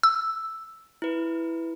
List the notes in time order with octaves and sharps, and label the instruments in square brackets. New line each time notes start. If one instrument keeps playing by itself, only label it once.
[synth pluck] E6
[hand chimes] E4 B4